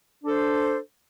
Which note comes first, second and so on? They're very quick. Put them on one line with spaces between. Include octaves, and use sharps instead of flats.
D4 A4 C5